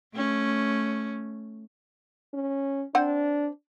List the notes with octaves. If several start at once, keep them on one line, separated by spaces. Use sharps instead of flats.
A3 C#4
C#4
C4 D4 C5 F#5